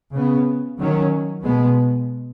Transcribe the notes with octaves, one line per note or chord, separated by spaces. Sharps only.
C#3 B3
D#3 F#3 C#4
B2 G#3 B3